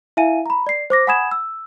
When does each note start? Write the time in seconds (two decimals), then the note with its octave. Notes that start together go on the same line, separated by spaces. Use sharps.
0.17 E4 E5 F5 G#5 D#7
0.46 A#5 B5
0.67 D5 C7
0.90 C5 D6 A#6
1.07 F#5 G#5 B5 D#6 G#6 E7
1.31 E6